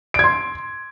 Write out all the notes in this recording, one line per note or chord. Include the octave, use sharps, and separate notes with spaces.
C6 G#6 D7